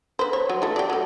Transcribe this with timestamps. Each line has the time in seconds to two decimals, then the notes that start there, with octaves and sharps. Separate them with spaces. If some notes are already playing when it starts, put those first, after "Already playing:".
0.19 B4 C5
0.33 C#5
0.50 F#3
0.62 E3 A3
0.76 G4 D5
0.90 F#3 A4